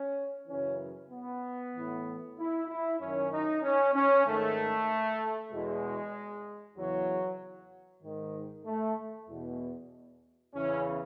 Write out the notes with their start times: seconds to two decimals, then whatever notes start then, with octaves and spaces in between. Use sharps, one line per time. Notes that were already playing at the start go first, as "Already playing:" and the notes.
Already playing: C#4
0.48 F#2 C#3 E3 C#4
1.11 B3
1.74 A2 E3
2.37 E4
2.68 E4
3.00 F#2 D#3 C#4
3.31 D#4
3.63 C#4
3.94 C#4
4.25 G#2 D#3 A3
5.52 E2 B2 G#3
6.77 E2 C#3 E3 F#3
8.03 G#2 D#3
8.65 A3
9.28 E2 B2
10.55 E2 C#3 E3 C#4